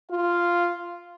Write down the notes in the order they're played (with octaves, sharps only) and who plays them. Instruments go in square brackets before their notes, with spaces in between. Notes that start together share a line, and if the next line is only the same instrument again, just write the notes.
[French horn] F4 [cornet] F5